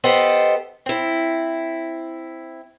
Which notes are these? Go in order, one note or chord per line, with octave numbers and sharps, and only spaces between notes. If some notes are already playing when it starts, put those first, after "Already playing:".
B3 G4 A4 C5 D#5
C4 E4